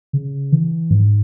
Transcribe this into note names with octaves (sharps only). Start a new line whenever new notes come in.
C#3
E3
G#2